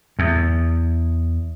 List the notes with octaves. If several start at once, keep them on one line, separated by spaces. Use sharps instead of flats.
E2